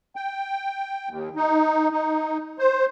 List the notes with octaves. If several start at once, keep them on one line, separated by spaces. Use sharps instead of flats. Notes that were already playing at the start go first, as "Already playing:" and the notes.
G5
D#2
D#4
D#4
C5